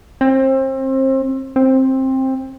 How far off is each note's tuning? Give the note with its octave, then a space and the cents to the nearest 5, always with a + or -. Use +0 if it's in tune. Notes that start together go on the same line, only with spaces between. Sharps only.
C4 +30
C4 +15